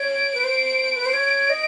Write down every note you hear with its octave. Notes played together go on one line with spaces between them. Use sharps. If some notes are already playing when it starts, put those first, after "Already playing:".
Already playing: C#5 D7
B4
C5
B4
C5
C#5
D#5